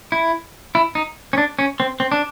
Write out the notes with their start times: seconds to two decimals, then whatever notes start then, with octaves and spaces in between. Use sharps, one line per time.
0.12 E4
0.75 E4
0.95 D#4
1.33 C#4
1.38 D4
1.59 C#4
1.80 C4
2.00 C4
2.12 D4